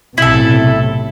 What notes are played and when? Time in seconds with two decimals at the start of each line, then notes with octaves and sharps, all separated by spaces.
0.18 B1 A2 C3 E4 A4